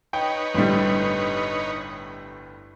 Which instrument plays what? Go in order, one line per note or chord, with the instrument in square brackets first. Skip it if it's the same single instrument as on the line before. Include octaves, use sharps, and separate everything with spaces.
[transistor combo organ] D#4 B4 C#5 [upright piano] G5
[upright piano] G1 A2 G3